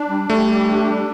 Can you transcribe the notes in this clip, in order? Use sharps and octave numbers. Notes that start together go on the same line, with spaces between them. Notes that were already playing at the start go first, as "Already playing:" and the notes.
Already playing: D4
G3
G3 A3
G4
D4
G3